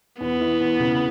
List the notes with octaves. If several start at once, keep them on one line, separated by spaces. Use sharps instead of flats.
E2 B3
E3
E2
C#3